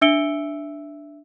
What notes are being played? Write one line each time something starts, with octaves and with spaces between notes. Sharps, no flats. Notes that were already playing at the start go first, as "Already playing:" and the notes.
D4 E5 E6 C#7 D7 G7